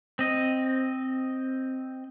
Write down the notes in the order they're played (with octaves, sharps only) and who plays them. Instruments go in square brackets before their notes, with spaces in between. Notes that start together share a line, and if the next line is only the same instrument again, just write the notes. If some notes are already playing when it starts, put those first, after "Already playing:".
[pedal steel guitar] C4 D#5